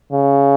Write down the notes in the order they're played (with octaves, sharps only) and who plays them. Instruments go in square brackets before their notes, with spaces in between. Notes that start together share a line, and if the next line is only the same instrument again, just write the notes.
[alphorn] C#3